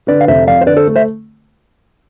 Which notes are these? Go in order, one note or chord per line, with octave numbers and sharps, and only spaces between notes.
D3 B4 D5
F5
F1 C5 E5
F2 D5 F5
C5
D3 B4 D5
A4 C5
A3
C5 E5